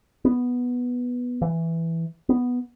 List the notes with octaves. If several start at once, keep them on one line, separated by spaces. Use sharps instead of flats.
B3
E3
B3